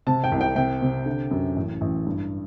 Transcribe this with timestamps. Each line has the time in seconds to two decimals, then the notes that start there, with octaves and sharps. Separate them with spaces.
0.07 C3 A5
0.24 G5
0.32 C2
0.41 G5
0.56 C3 G5
0.82 C3
1.06 D3
1.31 F#2
1.56 A1
1.81 A1
2.06 G2